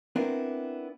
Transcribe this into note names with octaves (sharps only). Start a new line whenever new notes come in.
B3 C4 D4 E4 A#4